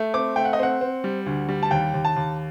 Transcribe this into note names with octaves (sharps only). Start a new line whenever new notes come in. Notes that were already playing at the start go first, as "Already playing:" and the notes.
Already playing: A3
C4 D6
A3 G5
F#5
D#5
C4 F#5
C4
G3
D2
G3
A5
D#2 G5
D#2
A5
D#2